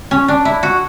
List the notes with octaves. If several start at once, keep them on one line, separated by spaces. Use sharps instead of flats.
C#4
D4
E4
F#4